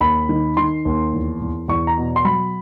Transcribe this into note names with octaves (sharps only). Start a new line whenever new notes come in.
D#2 B5
D#3
D#3 C6
D#2
E2
E2
E2 C#6
A#5
B2
C6
F#3 B5